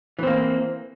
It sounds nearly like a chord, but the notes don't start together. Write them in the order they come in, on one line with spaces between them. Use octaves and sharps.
E3 C4 A#3